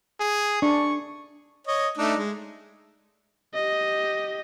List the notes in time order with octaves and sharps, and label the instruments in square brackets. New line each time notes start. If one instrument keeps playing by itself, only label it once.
[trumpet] G#4
[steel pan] D4 [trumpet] C#6
[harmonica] C#5 D#5
A3 D4 D#4
G#3
[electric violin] G4 D#5